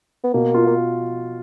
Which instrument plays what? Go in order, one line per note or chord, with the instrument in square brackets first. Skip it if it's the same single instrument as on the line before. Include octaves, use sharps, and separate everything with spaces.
[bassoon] B3
[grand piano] B2 [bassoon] A#3
[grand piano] F4
[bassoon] A#3